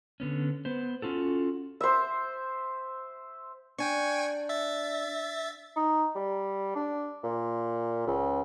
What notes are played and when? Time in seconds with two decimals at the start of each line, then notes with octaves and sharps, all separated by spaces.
0.20 D3 B3 C#4
0.65 B3 B4 C5
1.02 C#4 F4 F#4 A4
1.81 C5 E5
3.79 D4 G5 G#5 C#6
4.49 E5 A6
5.76 D#4
6.15 G3
6.76 D4
7.24 A#2
8.07 C#2